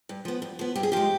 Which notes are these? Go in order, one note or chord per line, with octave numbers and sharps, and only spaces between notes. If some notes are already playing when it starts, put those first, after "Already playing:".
G2
F3 B3
G2
F3 B3
G2 G4
G#4
F3 G#3 G4